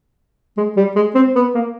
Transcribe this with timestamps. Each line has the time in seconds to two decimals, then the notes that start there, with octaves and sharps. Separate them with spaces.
0.57 G#3
0.76 G3
0.96 G#3
1.15 C4
1.35 B3
1.55 A#3